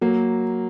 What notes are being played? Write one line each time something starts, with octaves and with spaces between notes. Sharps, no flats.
F#3 A#3